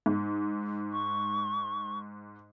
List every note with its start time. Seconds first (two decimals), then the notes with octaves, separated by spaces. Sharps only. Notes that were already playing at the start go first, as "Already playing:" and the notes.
0.06 G#2
0.92 C#6